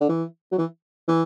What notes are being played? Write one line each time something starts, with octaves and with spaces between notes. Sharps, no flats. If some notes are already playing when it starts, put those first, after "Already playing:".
D3
E3
F#3
E3
E3